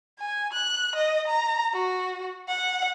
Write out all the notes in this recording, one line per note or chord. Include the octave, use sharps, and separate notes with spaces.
G#5
F#6
D#5
A#5
F#4
F#5